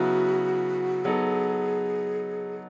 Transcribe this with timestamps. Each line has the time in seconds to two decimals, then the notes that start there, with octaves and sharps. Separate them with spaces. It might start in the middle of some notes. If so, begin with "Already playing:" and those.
Already playing: C#3 F#3 B3 E4 F#4
1.05 F#3 B3 D#4 G#4 A4